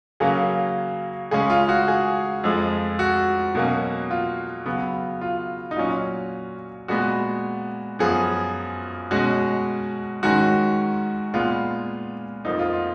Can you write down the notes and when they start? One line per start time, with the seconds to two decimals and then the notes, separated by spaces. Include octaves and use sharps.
0.20 C#3 F#3 A#3 C#4 G#4
1.31 C#3 G#3 C#4 G#4
1.50 F4
1.69 F#4
1.88 G#4
2.44 F2 F3 G#3
2.99 F#4
3.55 B2 F#3 A#3 C#4
4.11 F4
4.65 C#3 F#3 B3
5.21 F4
5.71 D#4
5.77 A#2 F#3 C#4 F4
6.88 A#2 G#3 B3 F#4
7.99 F#2 F3 B3 G#4
9.11 B2 G#3 C#4 F#4
10.23 G#2 D#3 G#3 C#4 F#4
11.34 A#2 G#3 B3 F4
12.45 F2 F3 A#3 D#4
12.59 F4
12.73 F4